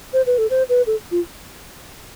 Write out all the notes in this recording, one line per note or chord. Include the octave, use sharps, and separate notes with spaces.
C5
B4
A4
C5
B4
A4
F4